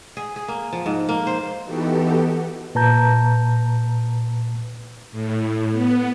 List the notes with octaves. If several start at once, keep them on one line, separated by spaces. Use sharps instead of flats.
G#4
G#4
A#3
F3
G#2
A#3
C5
E3 B3 D#4 F#4 G4 A4
A#2 B4 A5 A#5 G6
A2
B3